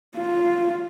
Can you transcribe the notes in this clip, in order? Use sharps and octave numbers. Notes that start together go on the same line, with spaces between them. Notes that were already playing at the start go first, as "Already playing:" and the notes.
F4